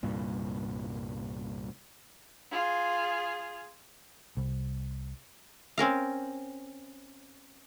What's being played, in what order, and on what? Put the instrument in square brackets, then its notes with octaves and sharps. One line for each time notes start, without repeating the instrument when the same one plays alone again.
[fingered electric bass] C2 G2 A#2
[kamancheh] F4 G#4
[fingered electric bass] C2
[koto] C4 C#4 A#4 F5